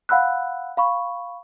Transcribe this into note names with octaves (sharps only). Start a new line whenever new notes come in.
F5 F#5 B5 E6 F#6
F5 B5 C#6